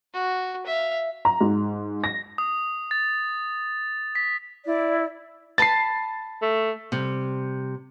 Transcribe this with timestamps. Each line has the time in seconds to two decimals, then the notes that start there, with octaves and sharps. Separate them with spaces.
0.14 F#4
0.66 E5 F5
1.25 A#5
1.41 G#2
2.04 A#6
2.38 D#6
2.91 A6
4.15 B6
4.66 E4 D5
5.58 B4 A5 B5 A6 C7
6.42 A3
6.92 C3 G3